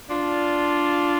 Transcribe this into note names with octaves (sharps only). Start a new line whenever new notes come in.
D4 F4